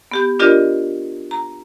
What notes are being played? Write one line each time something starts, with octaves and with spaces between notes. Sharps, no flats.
B3 G4 G6
D4 F4 G4 A#4 D5 D#5
A#5